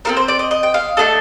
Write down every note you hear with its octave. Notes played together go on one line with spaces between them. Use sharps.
C4 F4 A4 A#4
C5
D5
D#5
D#5
G5
F5
A3 D4 A4 D#5